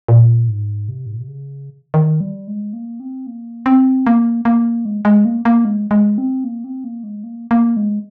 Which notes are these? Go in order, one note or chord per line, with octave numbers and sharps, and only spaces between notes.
A#2
G#2
C3
G#2
A#2
C3
C#3
D#3
G3
G#3
A#3
C4
A#3
C4
A#3
A#3
G#3
G#3
A#3
A#3
G#3
G#3
C4
A#3
C4
A#3
G#3
A#3
A#3
G#3